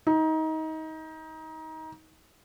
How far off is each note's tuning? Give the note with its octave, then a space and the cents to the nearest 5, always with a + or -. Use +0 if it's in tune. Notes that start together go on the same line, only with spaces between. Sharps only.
D#4 +25